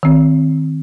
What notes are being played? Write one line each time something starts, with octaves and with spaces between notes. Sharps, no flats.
D#3 C4